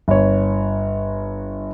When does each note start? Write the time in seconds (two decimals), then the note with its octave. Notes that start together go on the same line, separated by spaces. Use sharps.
0.08 G1 C#5